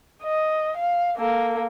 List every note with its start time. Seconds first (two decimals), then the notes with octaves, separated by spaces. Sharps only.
0.23 D#5
0.77 F5
1.17 A#3 A4